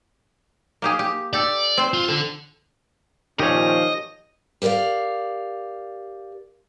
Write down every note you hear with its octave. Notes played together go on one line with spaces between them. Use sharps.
A#3 G4 G#4
G4
G4 A4 D5
C4 C5
F4
D3 A4
A#2 D#3 F3 C#4 G4 C#5 D#5
G4 A#4 C#5 D5 F5